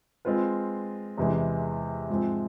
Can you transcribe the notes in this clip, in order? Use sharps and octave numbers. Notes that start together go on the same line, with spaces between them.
G#3 C4 F4 B4
E2 C3 E3 G#3
G#2 F3 G#3 C4